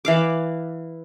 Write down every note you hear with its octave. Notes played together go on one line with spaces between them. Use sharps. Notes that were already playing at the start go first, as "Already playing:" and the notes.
E3 F5 D6